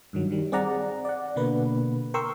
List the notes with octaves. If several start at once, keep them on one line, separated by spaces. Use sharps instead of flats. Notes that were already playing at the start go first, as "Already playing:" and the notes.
G2 D#3 F#3
D#3 G3
C4 G#4 D5 F#5 A#5
D5 F#5
B2 D3 A#3 B3 B4
A#4 G5 C6 C#6 E6